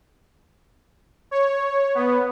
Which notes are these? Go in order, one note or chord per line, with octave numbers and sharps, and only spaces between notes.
C#5
B3